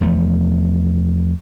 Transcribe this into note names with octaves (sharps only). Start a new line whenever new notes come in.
E2 F3 A3